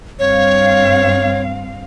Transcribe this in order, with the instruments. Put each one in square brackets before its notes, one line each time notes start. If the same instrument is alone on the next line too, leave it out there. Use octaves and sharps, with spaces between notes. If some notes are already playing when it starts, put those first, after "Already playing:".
[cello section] G2 C4 F5 [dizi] C#5